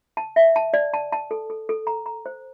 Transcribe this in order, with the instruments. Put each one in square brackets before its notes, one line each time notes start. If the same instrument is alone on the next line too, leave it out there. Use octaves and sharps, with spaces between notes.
[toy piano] A5
E5
A5
D5
A5
A5
A4
A4
A4
A#5
A#5
C5